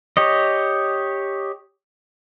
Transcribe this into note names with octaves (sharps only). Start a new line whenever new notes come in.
G4 C#5 D#5